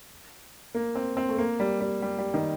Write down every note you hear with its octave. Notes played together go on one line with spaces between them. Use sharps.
A#3
C4
C4
A3
A#3
G3
G3
G3
G3
D#3